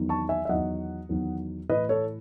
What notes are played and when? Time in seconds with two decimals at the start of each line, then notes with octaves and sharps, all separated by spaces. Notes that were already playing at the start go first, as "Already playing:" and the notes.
Already playing: E2 D#3 F#3
0.09 A5 C#6
0.29 E5 G#5
0.45 E5
0.49 E2 D#3 F#3 D#5 F#5
1.09 E2 D#3 F#3
1.69 A2 E3 B4 D#5
1.89 A4 C#5